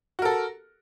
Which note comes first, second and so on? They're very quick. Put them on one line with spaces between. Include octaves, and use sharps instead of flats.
F#4 A#4 A4